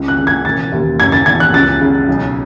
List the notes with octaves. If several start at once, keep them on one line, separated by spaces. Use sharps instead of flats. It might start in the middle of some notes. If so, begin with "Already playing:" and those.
Already playing: C#2
F#6
C#3
G#6
E1 A6
D#2
F#1 G#6
A6
E2 G#6
F#6
C#2 A6
C#3
B1